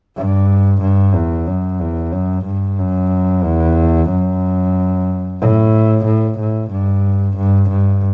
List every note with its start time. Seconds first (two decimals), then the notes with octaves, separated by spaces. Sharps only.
0.17 G2
0.82 G2
1.15 E2
1.47 F#2
1.80 E2
2.12 F#2
2.45 G2
2.79 F#2
3.44 E2
4.10 F#2
5.40 A2
6.05 A2
6.39 A2
6.71 G2
7.37 G2
7.70 G2